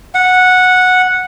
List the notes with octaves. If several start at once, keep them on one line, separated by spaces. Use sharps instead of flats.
F#5